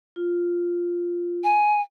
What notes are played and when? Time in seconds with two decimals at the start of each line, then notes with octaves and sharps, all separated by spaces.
0.16 F4
1.44 G#5